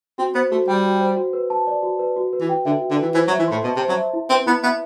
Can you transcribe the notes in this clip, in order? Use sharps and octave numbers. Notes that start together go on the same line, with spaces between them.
C4 F#4
B3 C5
A3 F#4
G3 G5
F#4
C5
F#4
B4
A5
D5
F#4
B4
F#4
B4
E3
G5
D3 E5
F#4
D3
E3 B4
E3 C5
F#3
E5
E3
A2 C6
B2 A5
C3
C5
F#3
E5
E4
C4 B4
B3 E4
B3 E5